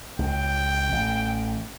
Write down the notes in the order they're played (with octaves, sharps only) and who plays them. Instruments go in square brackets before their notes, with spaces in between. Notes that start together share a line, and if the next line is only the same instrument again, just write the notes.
[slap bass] C#2 [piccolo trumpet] G5
[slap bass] A1